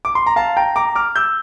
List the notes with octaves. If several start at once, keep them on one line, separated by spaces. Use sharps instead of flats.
D6
C6
A#5
F5 A5
G5 A#5
A#5 D6
D6 F6
E6 G6